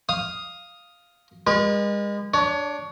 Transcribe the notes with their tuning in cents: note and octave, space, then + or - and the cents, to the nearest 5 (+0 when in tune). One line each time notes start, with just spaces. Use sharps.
F5 +0 D#6 +0
G#3 -35 B4 -45
D4 +0 C#5 +25